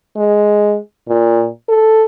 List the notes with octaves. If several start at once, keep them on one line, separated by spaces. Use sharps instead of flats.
G#3
A#2
A4